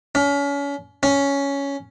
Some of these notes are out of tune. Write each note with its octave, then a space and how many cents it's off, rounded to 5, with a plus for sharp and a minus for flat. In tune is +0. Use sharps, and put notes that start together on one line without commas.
C#4 +35
C#4 +10